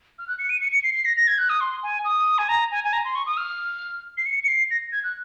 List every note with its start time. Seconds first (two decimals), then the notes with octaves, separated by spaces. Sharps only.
0.19 F6
0.28 F#6
0.39 C#7
0.50 D#7
0.61 C#7
0.72 C#7
0.83 C7
0.94 C7
1.05 A#6
1.17 A#6
1.27 G#6
1.38 F#6
1.49 D#6
1.61 C6
1.83 G#5
2.05 D#6
2.38 G#5
2.49 A#5
2.71 G#5
2.84 G#5
2.93 A#5
3.05 C6
3.15 C#6
3.26 D#6
3.37 F6
4.17 C7
4.26 C#7
4.43 C#7
4.48 C7
4.70 A#6
4.92 G#6
5.04 F#6